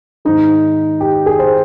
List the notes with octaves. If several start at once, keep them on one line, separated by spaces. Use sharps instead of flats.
G#2 D#3 D#4
G4
G#4
C5